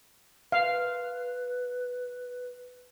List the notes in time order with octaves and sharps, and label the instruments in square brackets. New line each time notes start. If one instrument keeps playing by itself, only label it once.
[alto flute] B4 [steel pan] F5